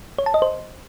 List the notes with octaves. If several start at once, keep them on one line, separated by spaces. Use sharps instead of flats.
C#5
A5
D#5
C5